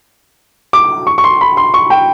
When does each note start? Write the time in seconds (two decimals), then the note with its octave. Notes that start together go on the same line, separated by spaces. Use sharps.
0.73 D6
1.07 C#6
1.18 C#6
1.24 C6
1.41 B5
1.57 C6
1.74 C#6
1.90 G5